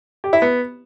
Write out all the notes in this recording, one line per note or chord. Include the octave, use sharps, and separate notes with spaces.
G4
E4
B3